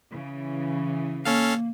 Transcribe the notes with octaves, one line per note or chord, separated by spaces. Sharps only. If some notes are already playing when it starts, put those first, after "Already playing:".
C#3 E3
A#3 C#4 A4 F5